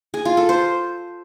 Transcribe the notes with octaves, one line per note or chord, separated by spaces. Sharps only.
G#4
F4
A4
C5